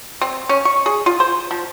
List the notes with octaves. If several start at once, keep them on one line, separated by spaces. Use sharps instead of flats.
C4
C#4
C#6
G#4
F4
C5
F3